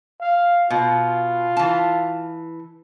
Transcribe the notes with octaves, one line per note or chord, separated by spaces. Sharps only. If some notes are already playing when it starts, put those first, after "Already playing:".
F5
B2 F4
E3 A5